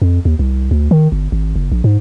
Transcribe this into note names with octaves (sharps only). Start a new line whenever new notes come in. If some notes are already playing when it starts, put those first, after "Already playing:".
F2
D#2
C2
D2
D#3
G1
G#1
F#1
A#1
G#2